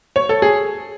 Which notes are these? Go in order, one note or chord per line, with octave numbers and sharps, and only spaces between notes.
C#5
A4
G#4